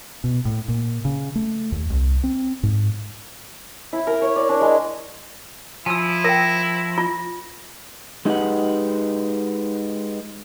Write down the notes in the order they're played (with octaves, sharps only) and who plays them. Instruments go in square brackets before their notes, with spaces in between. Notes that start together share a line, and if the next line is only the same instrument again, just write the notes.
[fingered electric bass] B2
A2
A#2
C#3
A3
D#2
C2
C4
G#2
[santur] E4
A#4
C#5
D5
D4
G#3
[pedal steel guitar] F3 [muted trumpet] E4 [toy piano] G#5 E6
[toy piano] A#4 G5 [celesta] A#6
[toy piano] F4
[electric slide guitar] G#3 D#4 G4 G#4 B4 F#5